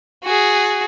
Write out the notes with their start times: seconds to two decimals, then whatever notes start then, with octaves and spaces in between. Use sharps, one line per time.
0.24 F#4 G#4